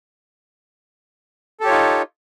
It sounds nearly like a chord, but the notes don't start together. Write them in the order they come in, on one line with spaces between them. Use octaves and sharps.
A4 G4 C#5 F4 D#4